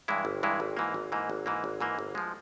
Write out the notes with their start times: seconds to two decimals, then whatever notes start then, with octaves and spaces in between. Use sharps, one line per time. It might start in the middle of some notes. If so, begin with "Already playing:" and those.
0.08 G2 E3 G#3 E4
0.25 G1
0.43 G2 E3 G#3 E4
0.60 G#1
0.77 G#2 E3 A#3
0.94 G#1
1.12 G#2 E3 A#3
1.30 G#1
1.46 G#2 E3 A#3
1.64 G#1
1.80 G#2 E3 A#3
1.99 G1
2.15 F3 G#3